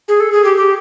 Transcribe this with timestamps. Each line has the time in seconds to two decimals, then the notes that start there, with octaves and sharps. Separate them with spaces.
0.08 G#4
0.20 A4
0.32 G#4
0.44 G4
0.57 G4